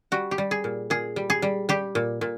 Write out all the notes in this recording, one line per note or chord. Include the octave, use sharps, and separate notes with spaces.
G3 F#4
G4
G3
G#4
A#2
A#2 G#4
G3
G#4
G3
G3 G4
A#2
A#2